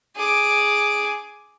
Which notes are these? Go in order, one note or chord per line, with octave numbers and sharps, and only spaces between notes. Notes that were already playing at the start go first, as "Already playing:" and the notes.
G#4 D6